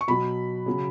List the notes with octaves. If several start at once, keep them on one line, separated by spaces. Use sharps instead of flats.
C#6
B2 F#3 B5
C#3 F#3